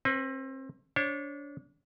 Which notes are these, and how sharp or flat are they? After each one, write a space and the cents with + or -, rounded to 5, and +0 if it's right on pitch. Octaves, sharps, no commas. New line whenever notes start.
C4 +35 B4 +5
D4 -30 C#5 -35